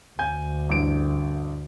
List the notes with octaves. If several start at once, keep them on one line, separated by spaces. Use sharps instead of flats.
D2 G#5 G6
A1 G2 D3 D7